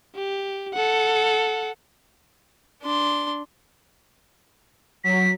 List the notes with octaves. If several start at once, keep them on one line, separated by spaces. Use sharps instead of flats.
G4
A4 F#5
D4 C6
F#3 B6